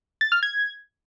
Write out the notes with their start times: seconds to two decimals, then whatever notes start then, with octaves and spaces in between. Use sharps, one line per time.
0.21 A6
0.32 F6
0.43 G#6